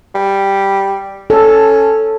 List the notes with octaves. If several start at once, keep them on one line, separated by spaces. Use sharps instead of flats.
G3
C#4 A4